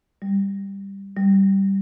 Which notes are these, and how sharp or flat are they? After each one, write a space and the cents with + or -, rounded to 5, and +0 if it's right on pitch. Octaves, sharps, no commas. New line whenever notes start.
G3 +10
G3 -5